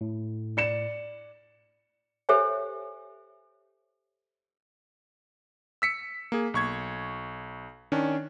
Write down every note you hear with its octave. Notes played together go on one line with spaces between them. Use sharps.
A2
D5 C#7 E7
G4 A4 C5 C#5 E5 G#5
E6 B6 C#7
A#3 G#4
B1 C#6 G#6
D#3 C#4 D4